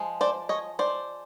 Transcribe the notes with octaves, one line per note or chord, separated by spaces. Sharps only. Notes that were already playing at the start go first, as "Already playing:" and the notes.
Already playing: F3 G#3
C5 D5
C#5 D#5
C5 D5